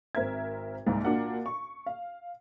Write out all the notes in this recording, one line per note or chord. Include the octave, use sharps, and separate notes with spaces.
G#1 C4 A#4 E5 G#6
C2 G#2 A#3
A#2 D4 F#4 A#4 F#5
C#6
F5